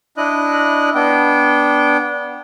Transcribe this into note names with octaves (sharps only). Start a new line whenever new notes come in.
D4 E4 D#5 F#6
B3 D4 G5